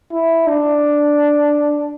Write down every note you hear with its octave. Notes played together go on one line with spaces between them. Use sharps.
E4
D4